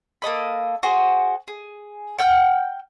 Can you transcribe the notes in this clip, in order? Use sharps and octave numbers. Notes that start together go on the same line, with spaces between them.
A#3 A4 D#5 B5
F#4 G#4 C5
G#4
F#5 G5 F6 G6